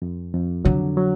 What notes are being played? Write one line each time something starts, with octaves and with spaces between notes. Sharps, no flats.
F2
F2
D3 F#3
F#3